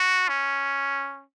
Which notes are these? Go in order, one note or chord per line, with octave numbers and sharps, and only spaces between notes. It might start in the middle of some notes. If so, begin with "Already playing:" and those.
Already playing: F#4
C#4